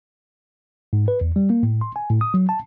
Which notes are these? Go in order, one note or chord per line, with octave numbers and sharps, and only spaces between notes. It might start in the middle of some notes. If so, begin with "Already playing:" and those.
G#2
B4
E2
G3
A#3
A2
C6
G#5
A2
D#6
F#3
A5